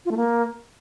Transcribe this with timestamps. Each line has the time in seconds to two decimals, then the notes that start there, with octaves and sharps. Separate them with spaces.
0.05 F4
0.11 A3
0.17 A#3